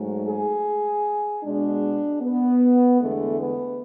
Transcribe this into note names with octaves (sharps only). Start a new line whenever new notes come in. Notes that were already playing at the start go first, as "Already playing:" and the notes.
Already playing: G#2 F#3 A3
G#4
B2 G#3 D4
B3
E2 D3 G#3 A3
B3